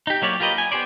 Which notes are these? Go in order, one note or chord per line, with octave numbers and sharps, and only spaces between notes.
D#4 G4
F#3 A#3 C#5 D5
F4 G4 A#4 B4 D#5
G#5
B3 G4 C5 D5